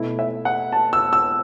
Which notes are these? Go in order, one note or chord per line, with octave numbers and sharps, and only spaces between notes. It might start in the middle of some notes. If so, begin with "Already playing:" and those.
Already playing: B2 A3 E4
E5
F#5
A5
E6
E6